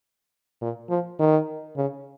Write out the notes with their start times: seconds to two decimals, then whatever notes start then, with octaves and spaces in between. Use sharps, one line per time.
0.62 A#2
0.90 F3
1.20 D#3
1.77 C#3